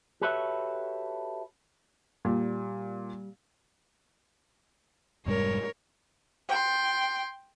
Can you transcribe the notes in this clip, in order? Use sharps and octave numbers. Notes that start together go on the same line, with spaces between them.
F#4 G4 A4 B4 C#5 E5
A#2 G3
F1 G#2 G3 A#4 C#5
G5 C6